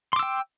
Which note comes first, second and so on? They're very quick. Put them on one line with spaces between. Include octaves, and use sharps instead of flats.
C6 D6 E6 G5